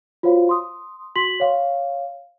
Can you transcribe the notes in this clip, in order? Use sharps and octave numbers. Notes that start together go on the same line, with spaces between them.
F4 F#4 C5 C#5 F5
C6 D#6
F#4 C6 B6 F#7
C#5 F5